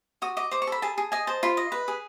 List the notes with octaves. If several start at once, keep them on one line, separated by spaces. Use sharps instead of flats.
F#4 D#6
D#5 D6
C5 D6
C#6
A4 B5
G#4 A5
G#4
D#5 G#5
C5 A5
F4 B5
D#5
B4
G#4